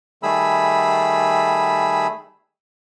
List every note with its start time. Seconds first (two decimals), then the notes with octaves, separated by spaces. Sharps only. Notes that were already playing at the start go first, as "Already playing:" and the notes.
0.23 D#3 G3 A3 G#4 B5 E6